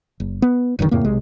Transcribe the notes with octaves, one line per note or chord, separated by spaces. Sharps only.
F#1
B3
E1 G2 D3 D#3
F2 A2 C#3 A#3
B1 C3 G#3